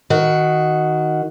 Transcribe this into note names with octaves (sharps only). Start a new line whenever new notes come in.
D#3 F#4